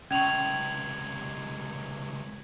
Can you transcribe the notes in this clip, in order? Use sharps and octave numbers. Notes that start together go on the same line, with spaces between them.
C#2 C3 C#4 C#6 G#6 F7 F#7